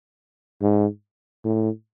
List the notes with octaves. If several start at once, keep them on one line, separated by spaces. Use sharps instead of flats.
G#2
A2